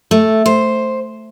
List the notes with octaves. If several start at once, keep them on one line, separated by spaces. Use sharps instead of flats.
A3
C5